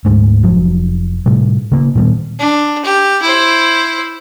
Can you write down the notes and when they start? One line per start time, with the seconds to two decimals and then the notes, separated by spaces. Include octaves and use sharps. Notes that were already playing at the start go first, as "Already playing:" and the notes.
0.05 D2 G#2 G#3
0.43 F1 F3 F#3
1.26 A2 C3 G3
1.72 C#3 A#3
1.95 A#2 D#3 G3 B3
2.39 D4
2.85 G4
3.22 E4 C5